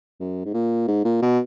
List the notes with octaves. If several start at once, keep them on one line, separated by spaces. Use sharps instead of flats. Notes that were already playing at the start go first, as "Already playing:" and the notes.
F#2
G#2
A#2
G#2
A#2
B2